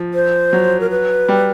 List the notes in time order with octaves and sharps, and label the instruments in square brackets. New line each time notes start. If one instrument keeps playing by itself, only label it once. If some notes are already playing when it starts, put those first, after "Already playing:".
Already playing: [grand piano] F3
[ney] C5
[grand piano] F#3
[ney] A#4
B4
[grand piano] G3